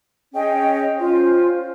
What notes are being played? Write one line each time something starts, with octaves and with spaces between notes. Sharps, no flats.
C#4 G#4 D#5 G5
C#4 F4 C5